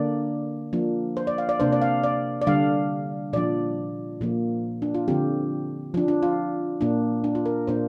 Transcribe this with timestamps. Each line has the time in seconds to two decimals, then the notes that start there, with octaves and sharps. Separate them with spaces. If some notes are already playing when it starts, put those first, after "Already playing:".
Already playing: D3 A#3 D4 D5
0.73 F3 A#3 D4
1.17 C5
1.27 D5
1.38 F5
1.49 D5
1.60 C3 A#3 D4 C5
1.72 D5
1.82 F5
2.04 D5
2.42 D5
2.47 D3 G3 D4 F5
3.33 A#2 F3 D4 D5
4.21 A#2 F3 A#3
4.82 D4
4.94 F4
5.08 D3 F3 C4 G4
5.94 F3 D4
6.08 D4
6.23 F4
6.81 A#2 A#3 D4
7.24 D4
7.35 F4
7.46 A#4
7.67 A#2 A#3 D4 C5